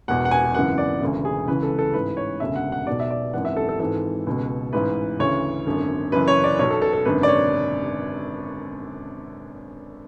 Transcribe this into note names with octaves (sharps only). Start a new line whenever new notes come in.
E1 E2 B2 F#5
F#5
G#5
G#1 F#2 C#3 E3 F#5
D5
E1 D2 C#3 E3
G#4
C#2 C#3 E3 B4
A4
A4
A1 G#2 E3 B4
C#5
E1 D2 C#3 E5
F#5
F#5
B1 B2 D5
E5
D5
G#1 F#2 E3 F#5
E5
A4
A4
G#1 G#2 E3 A4
C#2 B2
A1 G#2 E3 B4
D2 C#3 E3 C#5
G#1 F#2 D3
F#1 F#2 E3 B4
C#5
D5
B1 B2 C#5
A4
A4
A4
G#1 F#2 D3 B4
D5
C#5